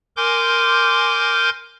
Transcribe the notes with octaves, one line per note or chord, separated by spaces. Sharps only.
A#4 G#5 C6 D6 G6